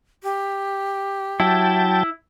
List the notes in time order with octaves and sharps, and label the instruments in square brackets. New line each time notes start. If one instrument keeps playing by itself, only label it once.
[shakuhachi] G4
[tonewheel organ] F#3 G5 A5 [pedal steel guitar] E4